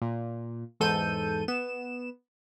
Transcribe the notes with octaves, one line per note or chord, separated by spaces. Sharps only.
A#2
E2 G#2 A4 G6 D#7
B3 E7